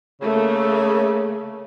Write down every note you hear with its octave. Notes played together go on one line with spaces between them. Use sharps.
C#3 A3 A#3